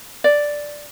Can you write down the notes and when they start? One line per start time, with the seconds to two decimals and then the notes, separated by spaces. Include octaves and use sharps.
0.24 D5